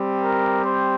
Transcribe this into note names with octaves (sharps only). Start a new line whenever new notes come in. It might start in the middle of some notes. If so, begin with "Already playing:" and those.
Already playing: G3 C4 G4
A#4
C5